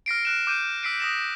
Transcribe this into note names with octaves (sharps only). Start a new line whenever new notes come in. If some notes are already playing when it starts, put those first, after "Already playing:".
F6 A#6 C7 D7
F6 F#6 E7
D6 G6 D#7
E6 B6 C7 D7 D#7
D#6 A#6 E7